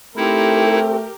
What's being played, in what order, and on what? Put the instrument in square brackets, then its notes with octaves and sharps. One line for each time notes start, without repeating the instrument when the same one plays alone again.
[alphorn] A3 [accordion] C4 [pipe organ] D#4 E4 [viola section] G4 A#4